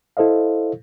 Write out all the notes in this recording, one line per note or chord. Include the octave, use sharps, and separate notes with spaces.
E4 A4 C5 D#5 F5